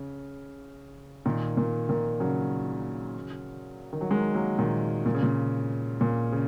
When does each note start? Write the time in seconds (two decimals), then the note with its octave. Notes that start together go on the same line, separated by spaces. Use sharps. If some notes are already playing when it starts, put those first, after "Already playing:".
Already playing: C#3
1.26 A#2 D#3
1.57 A#2
1.89 A#2 D#3
2.20 C#3 F#3
3.93 D#3
4.01 F#3
4.11 D#3 G#3
4.34 F#3 A#3
4.59 A#2 D#3
5.06 A#2
5.14 C#3
5.23 A#2
6.01 A#2
6.32 C#3